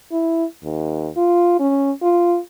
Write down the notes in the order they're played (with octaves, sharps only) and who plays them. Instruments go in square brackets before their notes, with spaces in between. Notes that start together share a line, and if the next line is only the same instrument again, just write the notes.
[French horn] E4
D#2
F4
C#4
F4